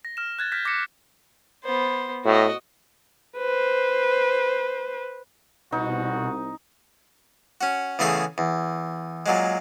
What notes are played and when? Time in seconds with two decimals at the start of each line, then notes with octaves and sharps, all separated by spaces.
0.05 A#6
0.17 F6 E7
0.39 F#6 G#6 A6
0.52 F6 G6 A#6 B6
0.65 D6 A#6 B6 C#7 E7
1.65 B3 C5
2.25 A2 F#4 D#5
3.37 B4 C5
5.72 C2 B2 D#4 F#4
7.61 C#4 F#4
7.99 E2 C#3 A3 G#4 C6
8.38 E2
9.26 A#2 F#3 G#3